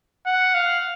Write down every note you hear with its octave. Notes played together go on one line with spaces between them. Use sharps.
F#5
F5